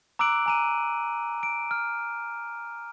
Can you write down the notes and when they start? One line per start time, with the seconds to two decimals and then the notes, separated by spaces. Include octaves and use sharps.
0.19 A#5 D6 E6 F#6 D7 F#7
0.46 G#5 A#5 D#7
1.43 D7
1.71 F6